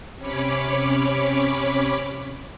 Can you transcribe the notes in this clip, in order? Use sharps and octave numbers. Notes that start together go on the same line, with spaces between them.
C3 C#4 C#5 B5 D6